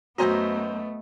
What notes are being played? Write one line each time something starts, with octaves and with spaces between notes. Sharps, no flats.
F#2 A3 B3 F#4 C5 D#5 A#5